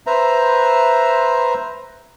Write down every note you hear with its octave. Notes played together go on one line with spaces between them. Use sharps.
B4 C5 E5 A#5